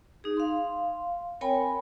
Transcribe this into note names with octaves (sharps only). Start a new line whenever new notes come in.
D#4 G#4
F5 C6
C4 A#4 C#5 G5 G#5 B5